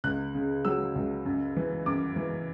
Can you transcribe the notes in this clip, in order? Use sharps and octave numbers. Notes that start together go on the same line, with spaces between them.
C#2 F#6
C#3
F#3 E6
C#2
F#2
E3
F#2 D6
E3